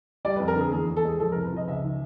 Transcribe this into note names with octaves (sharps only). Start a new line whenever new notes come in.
G3 D5
B4
F2
A#4
D3 G#4
E2 G#4
E2
A4
G#3 G#4
F3 A4
A#4
C2
B4
F3 D#5
C#2 E5
D#3